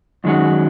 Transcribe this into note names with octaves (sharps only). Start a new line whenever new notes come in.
F#2 D#3 G#3 C#4 F#4